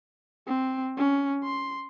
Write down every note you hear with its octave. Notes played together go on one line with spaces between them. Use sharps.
C4
C#4
C6